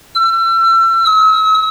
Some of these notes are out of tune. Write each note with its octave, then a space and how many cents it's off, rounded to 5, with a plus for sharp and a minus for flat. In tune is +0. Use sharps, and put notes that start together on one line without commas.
E6 +35
E6 -45